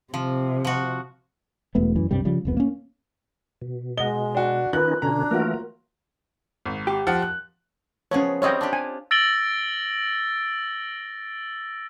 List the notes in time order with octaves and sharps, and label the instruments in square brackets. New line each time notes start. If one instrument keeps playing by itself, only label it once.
[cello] C3 [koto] F3
[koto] F3 F#4
[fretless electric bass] E1 A3 B3
F#2 E3
C2 G2 C3 G3
C#3 F3 G3
E1 C2 B3
A#3 C#4
[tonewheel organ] B2
[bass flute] G#3 [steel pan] D#5 F#5 [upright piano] G7
[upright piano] D4 F#4
[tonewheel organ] D#3 C#4 D#4 [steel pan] F4 [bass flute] B4 [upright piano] F#6
[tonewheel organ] B2 D3 C#4 [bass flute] D4 [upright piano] A#5
[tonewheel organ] E3 A3 A#4 [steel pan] A#3 F4 F#4
[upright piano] G#1
[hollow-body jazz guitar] G4
[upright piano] F3 F#5
F#6
[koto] F3 B3 G#4 [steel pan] C#4 C#5
[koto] G3 C4 F4 [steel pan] C#5 D#5 G5
[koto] D4 F4 G4
[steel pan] G#5
[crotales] E6 A6 A#6 D7 F#7 G7